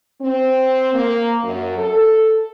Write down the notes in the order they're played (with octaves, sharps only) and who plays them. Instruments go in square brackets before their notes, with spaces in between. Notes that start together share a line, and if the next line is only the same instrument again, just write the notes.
[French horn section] C4
A#3
F#2
A4